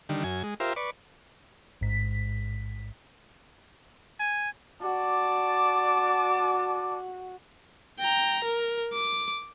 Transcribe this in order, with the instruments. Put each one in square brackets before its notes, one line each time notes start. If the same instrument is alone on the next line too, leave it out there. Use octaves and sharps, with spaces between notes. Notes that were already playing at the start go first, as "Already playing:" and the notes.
[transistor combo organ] D3 D#3 G3
F#2 G#5
G#3
F4 G4 A#4 C5 E5
B4 D5 C#6
[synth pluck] A1 G#2 B6
[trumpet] G#5
[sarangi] F#4 [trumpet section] D5 A5 D6
[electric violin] G5 A#5
A#4
D6